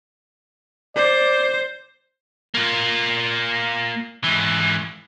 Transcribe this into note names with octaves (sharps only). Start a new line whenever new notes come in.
C5 D5
A#3 F4
G#2 E3